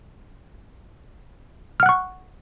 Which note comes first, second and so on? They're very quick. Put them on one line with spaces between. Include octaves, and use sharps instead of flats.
F6 F#5 F#6 C#6